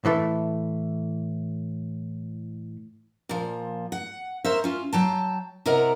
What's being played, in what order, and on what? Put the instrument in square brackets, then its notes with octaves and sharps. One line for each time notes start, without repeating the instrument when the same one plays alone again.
[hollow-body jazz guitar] A2 E3 A3
[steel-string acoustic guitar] A#2 F3
F#5
A#4 C5 C#5 E5
C#4 F4
F#3 G5 A5
C3 E4 A#4 D#5 F#5 A#5